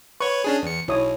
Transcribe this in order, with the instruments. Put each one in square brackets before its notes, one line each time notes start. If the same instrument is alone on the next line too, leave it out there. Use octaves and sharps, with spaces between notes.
[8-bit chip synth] B4 C#5 [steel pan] C#6
[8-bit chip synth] C#4 D4 G#4
E2 C#7
[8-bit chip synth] B1 [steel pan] E4 C#5 D#6